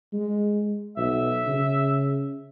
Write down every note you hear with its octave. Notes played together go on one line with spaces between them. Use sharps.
G#3
B1 E5
C#3